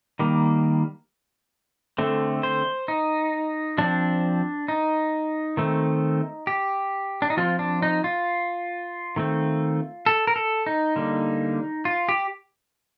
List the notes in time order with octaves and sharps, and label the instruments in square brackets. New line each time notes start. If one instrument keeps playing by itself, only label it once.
[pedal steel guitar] D#3 G3 A#3
D3 A3 C4
C5
D#4
F3 C4 D4
D#4
D#3 A3 C4
G4
D4
D#4
F3 C4 F4
D4
D#4
F4
D#3 A3 C4
A4
A#4
A4
D#4
D3 G3 A#3
F4
G4